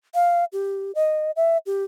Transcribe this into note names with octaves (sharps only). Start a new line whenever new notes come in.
F5
G4
D#5
E5
G4